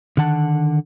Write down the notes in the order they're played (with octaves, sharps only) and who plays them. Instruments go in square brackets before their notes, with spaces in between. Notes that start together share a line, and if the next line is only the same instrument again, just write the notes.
[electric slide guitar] D3 D#3 F#5 A5